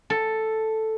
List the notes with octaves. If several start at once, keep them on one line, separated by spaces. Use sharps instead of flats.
A4